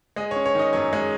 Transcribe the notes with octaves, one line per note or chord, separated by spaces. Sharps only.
G#3 D#5
C#5
C#4
C#5
D#3 D#5
F#2 C#5
G#3